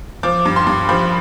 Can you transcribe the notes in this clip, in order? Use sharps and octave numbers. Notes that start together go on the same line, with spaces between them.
F3 D6
G2
C6
G2
F3 B5